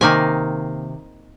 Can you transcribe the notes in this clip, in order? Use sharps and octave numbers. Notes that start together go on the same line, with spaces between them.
C3 D#3 A#3 D#4 G#5